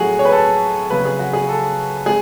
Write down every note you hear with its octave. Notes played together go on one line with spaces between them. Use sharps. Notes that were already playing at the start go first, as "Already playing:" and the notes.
Already playing: A2 F#3 F#4 G#4
C#5
B4
A4
C#3 F#3 B4
G#4
F#4
G#4
A4
G#3 G#4